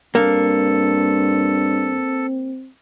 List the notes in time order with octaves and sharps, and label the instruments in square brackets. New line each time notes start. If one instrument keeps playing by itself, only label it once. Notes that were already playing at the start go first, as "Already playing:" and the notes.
[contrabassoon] G2 [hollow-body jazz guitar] A#3 [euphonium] C4 [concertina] A4